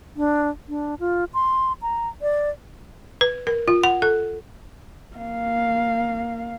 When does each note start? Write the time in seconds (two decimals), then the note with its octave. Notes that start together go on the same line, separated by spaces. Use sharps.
0.17 D4
0.69 D4
1.00 F4
1.34 C6
1.82 A#5
2.22 D5
3.21 B4
3.47 A#4
3.68 F4
3.84 F#5
4.02 A4
5.17 A#3 F5